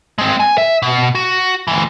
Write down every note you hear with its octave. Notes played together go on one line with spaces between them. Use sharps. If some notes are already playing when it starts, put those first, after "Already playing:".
G#3 C4
G#5
E5
B2
F#4
D2 E3